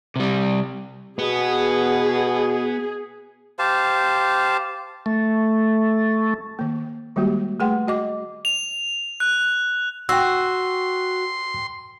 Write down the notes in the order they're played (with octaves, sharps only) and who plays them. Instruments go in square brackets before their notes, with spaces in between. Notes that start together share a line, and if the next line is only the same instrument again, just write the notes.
[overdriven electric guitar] C3 G3
[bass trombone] B2 [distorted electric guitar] B3 [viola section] G#4
[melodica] G4 C5 F5 A5
[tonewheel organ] A3
[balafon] D#3 A#3
D#3 G3 G#3 A#3 F#4 G4
A3 G#4 B4 F#5 G5 C6
F#4 D#5 D6
[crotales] F7
F#6
[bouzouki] F#4 [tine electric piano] G5 E6 [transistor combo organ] C6